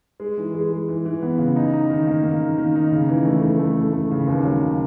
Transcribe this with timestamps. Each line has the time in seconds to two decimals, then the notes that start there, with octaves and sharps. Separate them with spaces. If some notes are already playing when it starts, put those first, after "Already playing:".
0.20 G#3
0.37 E3
0.54 G#3
0.71 G#3
0.89 E3
1.05 E3
1.22 B3
1.38 C#3
1.56 D#4
1.74 D#4
1.90 D#3
2.07 A#3
2.24 A#3
2.40 D#3
2.58 D#3
2.75 D#4
2.91 C#3
3.09 E3
3.26 A3
3.42 A3
3.59 A3
3.77 A3
3.93 A3
4.11 C#3
4.27 D#2
4.45 F#3
4.62 C#3